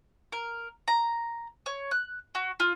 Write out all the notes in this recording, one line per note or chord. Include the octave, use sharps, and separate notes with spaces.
A#4
A#5
C#5
F#6
F#4
F4